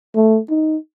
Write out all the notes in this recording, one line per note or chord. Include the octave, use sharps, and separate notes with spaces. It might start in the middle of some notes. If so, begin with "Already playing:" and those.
A3
D#4